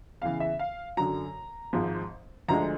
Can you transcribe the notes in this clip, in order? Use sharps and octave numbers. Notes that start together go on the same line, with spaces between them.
E2 C#3 E3 F5
E5
F5
F#2 D3 F#3 A#5
G#1 G#2 F3
D2 D3 F3 G#3 A#5